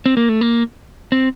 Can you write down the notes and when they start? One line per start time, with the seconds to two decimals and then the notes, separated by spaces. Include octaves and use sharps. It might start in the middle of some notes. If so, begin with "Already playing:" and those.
0.06 C4
0.17 A#3
0.29 A3
0.41 A#3
1.12 C4